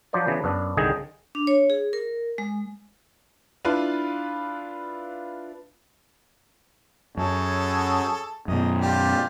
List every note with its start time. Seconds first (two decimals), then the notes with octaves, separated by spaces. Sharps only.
0.13 F3 F#3 D4 C5 D5
0.26 C#3 E3 B3 D4
0.44 F#2 B3 D4
0.77 C2 D3 D#3 G#4 D#5 G5
1.35 D4
1.47 C#5
1.70 G#4
1.93 A#4
2.38 G#3
3.65 D4 E4 F4 B4
7.17 F#2 G#4 A4 C#5
8.48 F#2 B2 D#5
8.81 F4 G4 D5